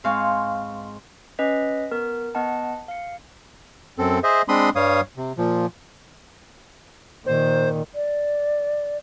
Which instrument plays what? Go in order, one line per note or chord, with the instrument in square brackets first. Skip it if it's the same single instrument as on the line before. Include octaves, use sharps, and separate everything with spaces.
[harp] G#2 C4 F5 G#5 C#6
[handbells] C#4 B4 D#5 B6
B3 A#4
B3 D#5 F#5 A5
F5 C#7
[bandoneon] F#2 C4 A4
G#4 C5 D#5 E5
G#3 C4 D4 B5 C6 D#6
G2 G3 C#5 F5 D#6
C3
A#2 F3
[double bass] A#2 D#3 [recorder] C5
[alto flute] D5